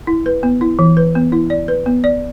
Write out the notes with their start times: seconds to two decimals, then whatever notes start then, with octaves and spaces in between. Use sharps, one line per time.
0.07 E4
0.26 B4
0.43 B3
0.61 E4
0.79 E3
0.97 B4
1.15 B3
1.32 E4
1.50 D5
1.68 B4
1.86 B3
2.04 D5